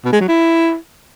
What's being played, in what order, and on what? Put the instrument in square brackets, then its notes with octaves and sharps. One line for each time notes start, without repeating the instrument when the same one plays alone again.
[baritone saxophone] B2
G#3
F#3
E4